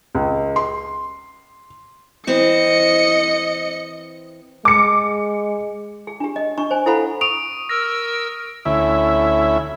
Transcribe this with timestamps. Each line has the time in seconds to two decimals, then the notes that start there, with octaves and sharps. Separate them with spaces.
0.15 C#2
0.56 C6
2.27 E3 C4 C5 D#5 C#7
4.65 G#3 D6 C#7
6.07 G#4
6.20 D4 G4
6.36 D#5
6.58 D4 C#6
6.71 C5 G#5
6.86 E4 A4 C5 F5 F#5 B5
7.21 C#6 D#6 D7 F7
7.69 A#4 E6 A#6
8.65 D2 C#4 E4 E5